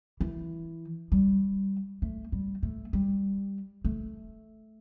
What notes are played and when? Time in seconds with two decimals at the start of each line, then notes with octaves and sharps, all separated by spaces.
0.20 E3
1.12 G3
2.02 A3
2.32 G3
2.63 A3
2.93 G3
3.85 A3